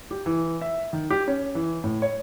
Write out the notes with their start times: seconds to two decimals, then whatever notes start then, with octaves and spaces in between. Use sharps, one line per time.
0.11 G4
0.26 E3
0.61 E5
0.93 D#3
1.11 G4
1.28 C#4
1.55 E3
1.84 A2
2.02 C#5